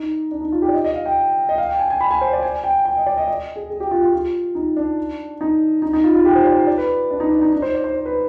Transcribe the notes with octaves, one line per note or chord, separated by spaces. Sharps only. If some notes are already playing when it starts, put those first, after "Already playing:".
Already playing: D#4
D4
D#4
F4
G4
D5
D#5
D#5
F5
G5
D#5
F5
G5
G#5
G#5
B5
G#5
C5
D5
G#5
G5
G5
D#5
D5
D#5
D#5
G#4
G#4
G4
F4
F4
F4
D#4
D4
D#4
D#4
D#4
F4
F4
G4
C5
D5
D5
B4
D4
D#4
D4
D#4
D#4
C5
D5
C5
C5
B4